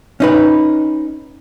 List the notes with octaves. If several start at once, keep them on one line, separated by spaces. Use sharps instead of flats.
C#4 D#4 B4